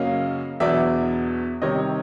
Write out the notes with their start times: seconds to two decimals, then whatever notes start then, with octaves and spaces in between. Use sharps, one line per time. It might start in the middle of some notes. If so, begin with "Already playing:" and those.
Already playing: F#2 C#3 F#3 A#3 C#4 D#5 F5
0.60 E2 B2 F#3 B3 D4 D5 E5
1.62 C3 D#3 G3 C4 C#5 D#5